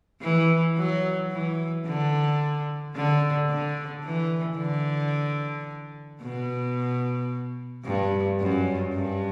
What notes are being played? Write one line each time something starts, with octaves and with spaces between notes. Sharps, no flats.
E3
F#3
E3
D3
D3
D3
E3
D3
B2
G2
F#2
G2